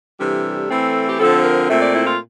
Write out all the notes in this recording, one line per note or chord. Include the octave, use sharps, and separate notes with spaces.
C3 E3 G3 D4 A4
E3 A3 C4
G4
D3 F3 C4 A4
A#4
A#2 A3 C4 E5
D5
E4
F4